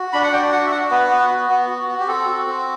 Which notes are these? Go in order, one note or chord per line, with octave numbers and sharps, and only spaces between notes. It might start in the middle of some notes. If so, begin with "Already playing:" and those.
Already playing: F#4
D4 B5
F#5
D4 G5
F#4 F#5
E5
F#4 F#5
B3 B4
B3
F#4
B3
F#4
F#4
G4
C4 A4
F#4
C4